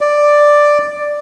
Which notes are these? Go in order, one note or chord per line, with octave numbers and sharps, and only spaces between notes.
D5